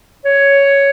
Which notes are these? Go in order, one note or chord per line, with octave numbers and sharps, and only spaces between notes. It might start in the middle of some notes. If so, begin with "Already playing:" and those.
C#5